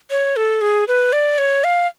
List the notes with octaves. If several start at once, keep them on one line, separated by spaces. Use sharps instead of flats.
C#5
A4
G#4
B4
D5
C#5
F5